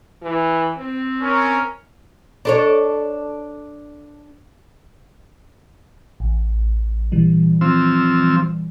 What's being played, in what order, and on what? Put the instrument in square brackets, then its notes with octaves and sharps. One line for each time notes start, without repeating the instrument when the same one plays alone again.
[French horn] E3
C4
[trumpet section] C#4 A#4
[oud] D4 A4 C#5
[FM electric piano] A1
A#2 E3 G3
[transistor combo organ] F3 C4 E6